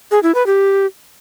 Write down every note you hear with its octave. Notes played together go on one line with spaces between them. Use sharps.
G#4
E4
B4
G4